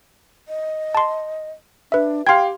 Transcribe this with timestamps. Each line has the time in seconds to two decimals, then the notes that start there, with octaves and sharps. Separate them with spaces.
0.48 D#5
0.95 A5 C6
1.92 D4 B4 E5
2.27 G4 F5 G5 C6 G#6